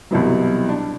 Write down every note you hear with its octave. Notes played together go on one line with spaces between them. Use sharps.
C2 B2 E3 F#3
D4